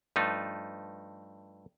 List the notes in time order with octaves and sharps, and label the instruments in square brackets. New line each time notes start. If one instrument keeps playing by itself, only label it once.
[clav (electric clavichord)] G2 F3 A3 D#4